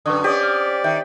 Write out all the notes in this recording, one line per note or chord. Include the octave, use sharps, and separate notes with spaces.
F#2 D3 B4 C#6 D#6
C4 C#4 G4 D5 D#5
F6
D#3 E5 G5